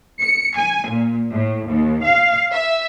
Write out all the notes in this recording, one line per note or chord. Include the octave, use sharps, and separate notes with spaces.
C#7
G#5
A#2
A2
D#2
F5
E5